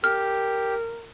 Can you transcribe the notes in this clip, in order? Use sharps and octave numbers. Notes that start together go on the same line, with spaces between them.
G4 A#4 F6